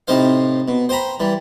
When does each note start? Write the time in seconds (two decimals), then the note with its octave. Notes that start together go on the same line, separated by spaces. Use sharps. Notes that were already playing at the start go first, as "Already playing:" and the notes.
0.08 A2 C3 D#4 C5 F5
0.68 B2
0.89 C5 G5 A#5 B5
1.20 E3 G3